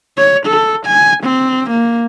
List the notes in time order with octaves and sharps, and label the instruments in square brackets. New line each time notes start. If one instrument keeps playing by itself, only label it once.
[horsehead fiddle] C#5
A4
G#5
C4
A#3